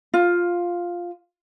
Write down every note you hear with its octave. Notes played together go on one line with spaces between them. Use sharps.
F4